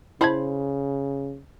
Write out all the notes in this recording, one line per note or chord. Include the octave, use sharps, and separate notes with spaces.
C#3 E4 C5 A5 B5 G#6